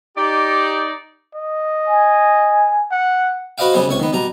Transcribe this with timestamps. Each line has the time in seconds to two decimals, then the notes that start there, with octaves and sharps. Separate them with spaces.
0.17 D#4 G4 D5
1.36 D#5
1.88 G#5
2.91 F#5
3.58 F#4 B4 C5 D#5 F5 G5
3.73 C#3 G3 B3 G#4 C5
3.88 C#2 C3 C#5 C#6
4.00 D#3 B3
4.13 B2 G3 A#5